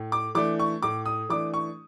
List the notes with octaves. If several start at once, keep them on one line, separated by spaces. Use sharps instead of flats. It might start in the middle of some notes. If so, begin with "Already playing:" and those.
Already playing: A2
D6
E3 A3 D4 D6
C#6
A2 D6
D#6
E3 A3 D4 D6
C#6